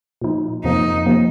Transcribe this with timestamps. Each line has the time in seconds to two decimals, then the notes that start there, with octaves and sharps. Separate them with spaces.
0.22 A#2 F3 D#4
0.64 F2 C3 F3 A#3 D#4
1.06 C3 F3 A#3